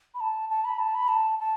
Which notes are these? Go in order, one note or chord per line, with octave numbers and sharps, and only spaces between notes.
B5
A5
A5
B5
A5
B5
A5
A5